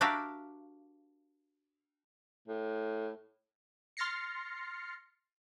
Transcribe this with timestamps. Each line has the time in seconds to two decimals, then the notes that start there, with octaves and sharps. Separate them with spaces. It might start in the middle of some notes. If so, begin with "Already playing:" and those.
0.01 D4 F#4 G4 A#4 E5 F5
2.48 A2
3.97 C6 F6 A6 A#6 C7 C#7